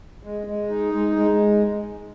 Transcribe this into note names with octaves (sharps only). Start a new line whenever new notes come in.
G#3
G#3
D#4
G#3
G#3